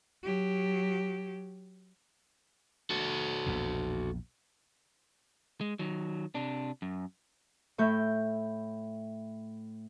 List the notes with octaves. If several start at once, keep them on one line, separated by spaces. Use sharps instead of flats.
F#3 G4
F#4 A4
A#1 E2 B2
G#3
D#3 F#3
C3 D4
F#2
A2 A3 E5 G6